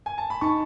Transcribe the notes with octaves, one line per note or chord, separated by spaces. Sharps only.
G#5
A5
B5
D#4 A5 C#6